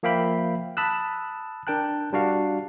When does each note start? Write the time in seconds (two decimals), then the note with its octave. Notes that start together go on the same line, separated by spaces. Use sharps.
0.03 F3 A#3 E5 F5 G5 B5
0.77 A5 B5 D#6 E6 F#6
1.67 D4 A#4 G5 A5 F#6
2.13 G3 D4 F#4 F5